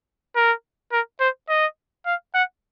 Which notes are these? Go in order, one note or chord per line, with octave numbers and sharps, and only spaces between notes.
A#4
A#4
C5
D#5
F5
F#5